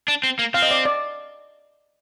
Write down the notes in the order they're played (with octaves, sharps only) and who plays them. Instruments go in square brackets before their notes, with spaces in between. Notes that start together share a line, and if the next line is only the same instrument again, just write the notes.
[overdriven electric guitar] D4
C4
A#3
[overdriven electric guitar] C4 [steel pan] F5
[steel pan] D#5
D5
D5